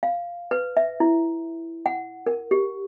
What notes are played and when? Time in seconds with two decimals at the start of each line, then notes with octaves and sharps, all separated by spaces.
0.03 F5
0.51 B4
0.77 E5
1.00 E4
1.86 F#5
2.26 A#4
2.51 G4